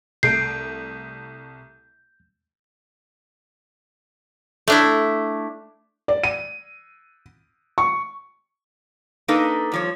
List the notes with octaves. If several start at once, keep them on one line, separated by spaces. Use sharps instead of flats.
C2 A3 G6 C7 D7
A3 D4 E4
D5
D#7
C#6
A#3 D4 D#4 A4 B4
G2 F3 C#5